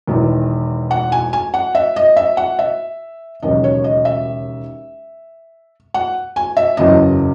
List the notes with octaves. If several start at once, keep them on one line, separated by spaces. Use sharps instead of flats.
E1 E2 D#3
F#5
G#5
G#5
F#5
E5
D#5
E5
F#5
E5
E1 D#2 C#3 F#3 D#5
C#5
D#5
E5
F#5
G#5
E5
F#1 E2 C#3 F#3 D#5